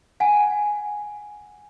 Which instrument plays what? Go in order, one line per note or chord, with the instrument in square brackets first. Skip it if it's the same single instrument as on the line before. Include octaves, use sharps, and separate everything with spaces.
[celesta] F#5 G#5